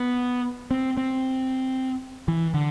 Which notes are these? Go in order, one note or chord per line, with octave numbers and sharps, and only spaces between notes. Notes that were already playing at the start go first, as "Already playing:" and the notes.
Already playing: B3
C4
C4
E3
D3